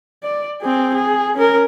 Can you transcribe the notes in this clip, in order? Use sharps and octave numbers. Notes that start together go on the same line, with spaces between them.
D5
C4 G#4
G#4
C#4 A#4